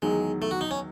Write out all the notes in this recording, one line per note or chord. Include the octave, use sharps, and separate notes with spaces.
E2 D#3 F#3 G#3
A3
F#4
D#4
C#4